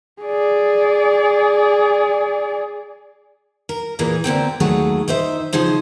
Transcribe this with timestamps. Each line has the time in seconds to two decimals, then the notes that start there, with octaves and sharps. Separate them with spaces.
0.22 G#4 D5
3.69 A#4
3.99 A#2 E3 A#3 G#4
4.24 D3 A#3 C4 G5
4.60 D#2 F#3 A3 F#4 G#4
5.08 D#3 D#4 C5 E5
5.53 C#3 F3 D#4 G#4 C5